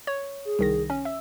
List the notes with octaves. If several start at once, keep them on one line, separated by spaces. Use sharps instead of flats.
C#5
G#4
C2 D#3 A#6
C#4
E5 E6